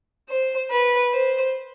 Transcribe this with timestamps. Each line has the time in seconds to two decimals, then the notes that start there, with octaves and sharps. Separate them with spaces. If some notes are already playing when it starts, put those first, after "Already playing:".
0.29 C5
0.71 B4
1.12 C5